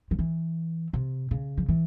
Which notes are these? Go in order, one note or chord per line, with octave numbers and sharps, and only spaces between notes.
F3
E3
C3
C#3
F3
E3